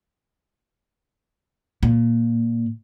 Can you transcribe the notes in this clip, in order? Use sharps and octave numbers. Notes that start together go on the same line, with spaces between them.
A#2